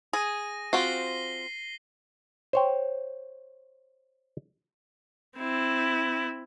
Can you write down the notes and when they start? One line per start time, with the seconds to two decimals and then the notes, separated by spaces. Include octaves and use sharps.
0.13 G#4 A#6 D#7
0.73 C4 F4 F#4 C7 G7
2.53 C5 C#5 G5
5.37 C4 E4